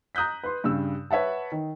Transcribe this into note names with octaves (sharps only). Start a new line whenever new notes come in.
A#5 D#6 F#6 G6 B6
B4 C6
G2 C#3 E6
B4 C#5 E5 F#5 A5
D#3